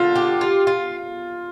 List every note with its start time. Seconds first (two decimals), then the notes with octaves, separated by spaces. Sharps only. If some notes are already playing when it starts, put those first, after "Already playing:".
Already playing: D3 F4
0.15 G4
0.41 F4
0.67 F4